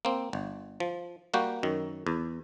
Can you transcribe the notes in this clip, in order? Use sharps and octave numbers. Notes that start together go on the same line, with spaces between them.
A#3 C4
G1
F3
G3 A#3 F#4 G5
F#2 D#3
E2